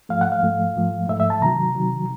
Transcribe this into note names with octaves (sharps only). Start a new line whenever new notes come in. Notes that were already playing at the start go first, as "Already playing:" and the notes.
G#2 F3 A3 F5
F#5
F5
G#2 F3 A3
G#2 F3 A3
G#2 F3 A3 E5
E5
A5
C3 D#3 F#3 A#5
C3 D#3 F#3